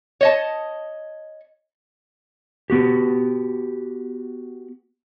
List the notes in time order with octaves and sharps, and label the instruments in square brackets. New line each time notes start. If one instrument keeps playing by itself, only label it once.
[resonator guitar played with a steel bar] C#5 D#5 A5
[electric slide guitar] B3 F#4 G4